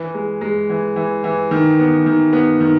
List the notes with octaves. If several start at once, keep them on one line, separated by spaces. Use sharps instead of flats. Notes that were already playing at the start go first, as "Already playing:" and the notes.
Already playing: E3
G#3
G#3
E3
E3
E3
D#3
B3
D#3
B3
D#3